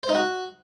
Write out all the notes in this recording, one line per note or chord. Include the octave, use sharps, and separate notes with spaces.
C5
D#4
F#4